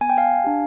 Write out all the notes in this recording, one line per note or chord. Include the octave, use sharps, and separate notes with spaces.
B3 G#5
G5
F5 G#5
D4 G4